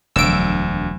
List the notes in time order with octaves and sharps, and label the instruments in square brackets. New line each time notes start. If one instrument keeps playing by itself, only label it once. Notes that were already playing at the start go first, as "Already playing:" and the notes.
[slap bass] E1 [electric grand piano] D2 [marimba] F3 F#3 [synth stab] E6 D7